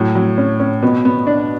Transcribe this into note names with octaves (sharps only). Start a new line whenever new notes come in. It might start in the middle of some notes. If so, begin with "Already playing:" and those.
Already playing: A2 F#3
F#3
C#4
C#4
B2 B3
B3
D4